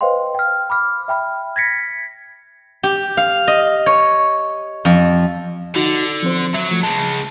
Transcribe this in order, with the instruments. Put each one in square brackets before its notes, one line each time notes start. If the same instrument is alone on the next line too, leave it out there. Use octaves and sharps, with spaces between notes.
[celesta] B4 C5 D#5 F5 G5 C6
G5 F6
B5 D6 F6
E5 G5 B5 F6
G#6 A#6 B6 C#7
[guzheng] G4
F5
D#5
C#5
F2
[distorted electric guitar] D3 [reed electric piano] D#4 F#4
[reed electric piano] F3 C4 C5
[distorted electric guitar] F#3 [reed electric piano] E5
[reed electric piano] F3 A3
[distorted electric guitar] C#3 G#3 [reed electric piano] A5